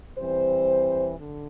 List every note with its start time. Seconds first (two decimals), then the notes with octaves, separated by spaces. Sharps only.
0.18 E3 G3 C4 C5
1.19 D3